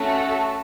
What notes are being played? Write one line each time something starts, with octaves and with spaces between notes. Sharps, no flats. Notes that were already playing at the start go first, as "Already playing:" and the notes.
Already playing: A3 C#4 F#4 A4